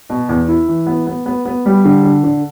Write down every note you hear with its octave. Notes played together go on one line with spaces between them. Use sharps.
B2
E2
E4
E3
B3
B3
B3
B3
G3
D3
D3
D3